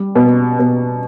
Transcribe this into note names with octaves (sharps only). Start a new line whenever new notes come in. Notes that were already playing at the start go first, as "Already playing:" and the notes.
Already playing: G3
B2
B2